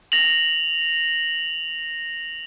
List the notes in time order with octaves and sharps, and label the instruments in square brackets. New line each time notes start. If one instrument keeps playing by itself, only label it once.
[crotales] A#6 F7 F#7